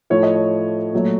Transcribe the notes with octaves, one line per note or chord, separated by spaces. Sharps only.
A2 F3 A3 C#5
D#5
C#5
A#2 F#3 A3